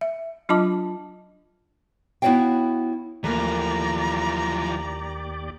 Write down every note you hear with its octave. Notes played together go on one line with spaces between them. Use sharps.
E5
F#3 D4 F4 D#5 A5 D6
B3 E4 F#4 C#5 F5 G5
D#2 E3 F3 A3 A#3 G4 D5 A#5